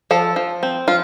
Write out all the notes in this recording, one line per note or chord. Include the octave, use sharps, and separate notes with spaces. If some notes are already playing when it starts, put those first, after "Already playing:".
F3 A4
F3
C4
F3 F4